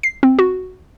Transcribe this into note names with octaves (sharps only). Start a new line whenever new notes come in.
C7
C4
F#4